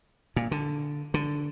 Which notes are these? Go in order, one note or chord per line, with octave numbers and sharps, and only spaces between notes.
A#2
D3
D3